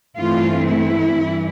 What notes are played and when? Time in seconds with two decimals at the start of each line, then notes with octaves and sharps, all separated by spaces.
0.17 G2 E3 A3 C4 F4
0.68 E4
1.17 G2 E3